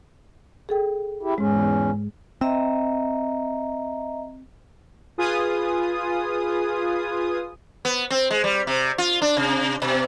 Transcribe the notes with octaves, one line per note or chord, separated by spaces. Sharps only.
G#4 A4 G5
E4 G4
E2 G#2 G#3 C#4
C4 D#5 E5 A#5
F4 G#4 B4 G#5 D#6
B3
C4
G#3
G3
C3
F4
D4
C3
B2